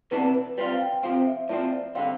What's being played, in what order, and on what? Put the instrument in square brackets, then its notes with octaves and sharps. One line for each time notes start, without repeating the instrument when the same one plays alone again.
[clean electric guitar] C3 E3 B3 D4 [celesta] B4
[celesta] B4
[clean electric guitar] G3 C4 F4 [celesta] B4
[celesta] F5
G5
G5
[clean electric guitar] C3 F3 C4 [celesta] F5
[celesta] E5
[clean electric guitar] A2 F3 C4 [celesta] D5
[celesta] D5
[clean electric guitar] D3 G3 C4 [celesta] F5